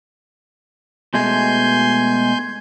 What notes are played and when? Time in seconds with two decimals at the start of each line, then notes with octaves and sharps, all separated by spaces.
1.14 B2 G#3 A3 G#5 C6 G6